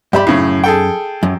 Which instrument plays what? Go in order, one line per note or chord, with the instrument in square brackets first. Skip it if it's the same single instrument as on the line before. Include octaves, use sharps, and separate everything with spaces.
[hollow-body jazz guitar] G2 E5 B5 [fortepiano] G4
[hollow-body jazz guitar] F#2 [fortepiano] A2 C#3
[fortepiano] G#4 A4 G5
[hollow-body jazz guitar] F#2